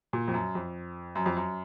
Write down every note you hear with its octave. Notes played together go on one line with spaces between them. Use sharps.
A#2
F2
F#2
F2
F#2
F2
F#2